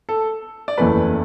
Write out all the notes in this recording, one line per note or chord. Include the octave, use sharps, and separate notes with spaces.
A4
D5
F#1 E2 E3 A3 B4